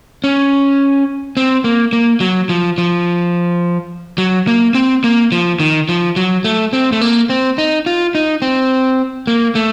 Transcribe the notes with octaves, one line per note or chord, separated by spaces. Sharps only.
C#4
C4
A#3
A#3
F#3
F3
F3
F#3
A#3
C4
A#3
F3
D#3
F3
F#3
A3
C4
A3
A#3
C4
D#4
F4
D#4
C4
A#3
A3